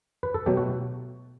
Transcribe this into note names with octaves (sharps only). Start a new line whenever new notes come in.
B4
A4
B2 F#3 A3 G4
F#4